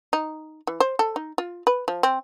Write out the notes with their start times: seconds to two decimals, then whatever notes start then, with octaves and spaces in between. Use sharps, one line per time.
0.13 D#4
0.67 E3
0.80 C5
0.99 A4
1.16 D#4
1.38 F4
1.67 B4
1.88 F3
2.03 C4